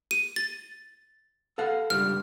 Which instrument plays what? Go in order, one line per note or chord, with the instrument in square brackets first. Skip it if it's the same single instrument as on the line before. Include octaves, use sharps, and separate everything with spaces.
[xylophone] D#7
A6
[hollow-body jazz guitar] A4 F5 F#5
[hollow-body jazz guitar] C#2 G2 G3 [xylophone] F6